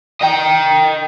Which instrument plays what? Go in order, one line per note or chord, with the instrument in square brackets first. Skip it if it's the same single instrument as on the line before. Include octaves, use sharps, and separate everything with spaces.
[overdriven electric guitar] D#5 G5